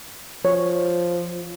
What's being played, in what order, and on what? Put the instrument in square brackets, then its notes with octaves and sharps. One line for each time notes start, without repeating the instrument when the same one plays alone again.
[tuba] F3 [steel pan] C#5